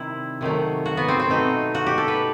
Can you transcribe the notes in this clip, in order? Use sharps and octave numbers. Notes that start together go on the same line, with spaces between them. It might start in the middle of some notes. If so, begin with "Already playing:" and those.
Already playing: C3 D#3 G3 E4
C3 D#3 F#3 A3
F#4
B3
C4
C4
B2 A3 D#4
F#4
G4
A4
B4